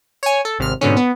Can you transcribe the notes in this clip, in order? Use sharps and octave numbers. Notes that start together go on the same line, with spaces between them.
C#5 G#5
A4
G#1 C3 F6
G#2 B2 D3 C#4
B3